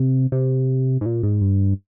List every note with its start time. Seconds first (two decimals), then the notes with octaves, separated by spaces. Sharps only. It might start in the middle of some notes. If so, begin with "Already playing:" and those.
Already playing: C3
0.32 C3
1.01 G#2
1.06 A#2
1.23 G#2
1.41 G2